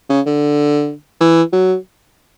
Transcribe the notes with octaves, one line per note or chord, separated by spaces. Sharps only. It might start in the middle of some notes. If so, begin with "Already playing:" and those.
C#3
D3
E3
F#3